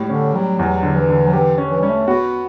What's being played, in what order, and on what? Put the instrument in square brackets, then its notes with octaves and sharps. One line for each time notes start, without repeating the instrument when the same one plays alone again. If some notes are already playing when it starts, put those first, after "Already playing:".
Already playing: [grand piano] A2 G3
[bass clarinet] D3 [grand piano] C#4
[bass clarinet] F#3 [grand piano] G3
[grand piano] E2 [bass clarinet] F#3
[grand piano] D3
[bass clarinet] E3
[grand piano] D3
[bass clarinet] F#3
[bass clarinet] E3 [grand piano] G4
[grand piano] C#4
[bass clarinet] E3
[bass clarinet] G3 [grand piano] C#4
[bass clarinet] A3
[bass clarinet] B3 [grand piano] F#4